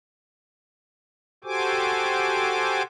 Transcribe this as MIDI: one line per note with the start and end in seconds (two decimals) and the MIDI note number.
1.44 2.82 66
1.44 2.82 67
1.44 2.82 69
1.44 2.82 72
1.44 2.82 80
1.44 2.82 86